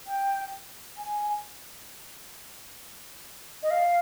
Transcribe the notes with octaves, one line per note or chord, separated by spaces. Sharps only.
G5
G#5
D#5
F5